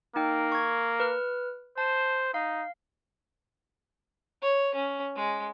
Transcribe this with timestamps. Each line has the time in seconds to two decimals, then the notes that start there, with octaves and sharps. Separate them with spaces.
0.16 A#3 D#4 G5
0.52 C#6 G#6
1.00 B4 F6
1.78 C5 A5
2.34 D#4 F5
4.42 C#5
4.75 C#4
5.16 G#3